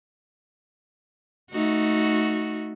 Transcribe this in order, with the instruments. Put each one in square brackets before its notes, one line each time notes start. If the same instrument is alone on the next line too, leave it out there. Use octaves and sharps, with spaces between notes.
[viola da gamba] A3 D#4 F#4